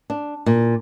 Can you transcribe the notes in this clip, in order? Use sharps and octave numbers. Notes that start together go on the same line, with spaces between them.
D4
A#2